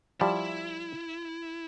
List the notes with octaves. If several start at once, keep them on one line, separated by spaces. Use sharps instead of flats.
F3 G3 E4